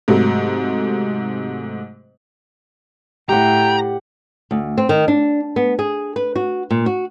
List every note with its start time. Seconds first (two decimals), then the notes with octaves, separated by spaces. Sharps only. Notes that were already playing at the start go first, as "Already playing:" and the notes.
0.08 G#2 C3 F#3 A3
3.29 A2 G4 F#5 G5 A#5
4.51 D2
4.78 C4
4.89 D#3
5.08 D4
5.56 B3
5.79 G#4
6.16 B4
6.36 F#4
6.71 A#2
6.86 F#4